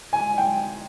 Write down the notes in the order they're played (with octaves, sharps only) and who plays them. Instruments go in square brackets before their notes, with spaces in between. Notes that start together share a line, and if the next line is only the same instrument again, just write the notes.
[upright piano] G#5
G5